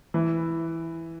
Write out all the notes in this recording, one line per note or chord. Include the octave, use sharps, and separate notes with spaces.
E3